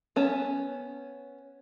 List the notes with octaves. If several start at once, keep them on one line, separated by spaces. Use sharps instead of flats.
B3 C#4 A5